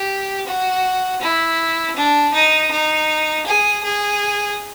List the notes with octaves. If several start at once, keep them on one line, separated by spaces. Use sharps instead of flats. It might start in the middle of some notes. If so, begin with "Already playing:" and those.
Already playing: G4
F#4
E4
D4
D#4
D#4
G#4
G#4